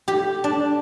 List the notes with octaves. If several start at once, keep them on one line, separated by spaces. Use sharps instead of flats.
G4
D4